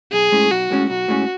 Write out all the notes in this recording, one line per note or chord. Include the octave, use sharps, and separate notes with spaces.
B1 G#4
A2 G#3 C#4
B1 F#4
A2 G#3 C#4
B1 F#4
A2 G#3 C#4